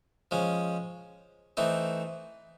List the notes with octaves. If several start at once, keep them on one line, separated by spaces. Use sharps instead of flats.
F3 G#3 C#4
E3 A3 C4 D#4